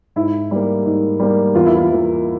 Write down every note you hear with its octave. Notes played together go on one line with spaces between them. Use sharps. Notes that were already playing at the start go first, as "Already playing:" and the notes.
G#2 E4
G3 A#3
G#2
G3 A#3
E2 F4
E4
F4
E3 A#3